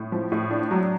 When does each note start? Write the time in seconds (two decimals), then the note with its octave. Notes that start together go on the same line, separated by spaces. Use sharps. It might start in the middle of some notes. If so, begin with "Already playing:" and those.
Already playing: A2
0.12 F3
0.32 A2
0.51 D4
0.71 F#3